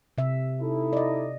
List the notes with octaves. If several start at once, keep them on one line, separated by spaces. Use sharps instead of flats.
C3 E5
D#4 E4 A4
D5 D#5